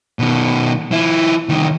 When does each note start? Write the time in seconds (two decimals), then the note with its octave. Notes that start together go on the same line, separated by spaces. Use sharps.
0.19 B2 D#3
0.91 F3 E4
1.49 C2 D#3